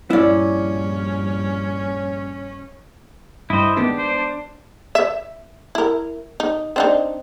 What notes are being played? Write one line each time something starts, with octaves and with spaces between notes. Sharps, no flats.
A#1 G2 C#4 E4 D5
G2 E4 C5 D#5
D#3 G#3 B3 D4 G4
C5
E5
E4 A#4
D#4
C4 D4 D#4